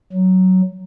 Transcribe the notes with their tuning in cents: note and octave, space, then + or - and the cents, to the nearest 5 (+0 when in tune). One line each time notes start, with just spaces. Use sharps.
F#3 +10